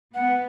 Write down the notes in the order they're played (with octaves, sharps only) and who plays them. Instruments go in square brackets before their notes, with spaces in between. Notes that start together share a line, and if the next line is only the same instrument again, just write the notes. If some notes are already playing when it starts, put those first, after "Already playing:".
[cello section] B3 [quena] F#5